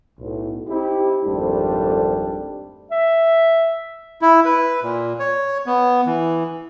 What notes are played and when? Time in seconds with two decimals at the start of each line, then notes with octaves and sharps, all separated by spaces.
0.19 B1 A2
0.68 C4 D#4 E4 G4
1.24 G#1 F2 G3 A3 D4 C5
2.91 E5
4.22 E4
4.45 B4
4.82 A#2
5.20 C#5
5.66 B3
6.06 E3